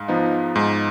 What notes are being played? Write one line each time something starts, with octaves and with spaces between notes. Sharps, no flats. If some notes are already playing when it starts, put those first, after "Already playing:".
Already playing: G#2 F5
F3 B3 D#4
G#2